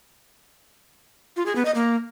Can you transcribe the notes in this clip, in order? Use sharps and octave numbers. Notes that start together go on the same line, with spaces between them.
F4
G#4
B3
D#5
A#3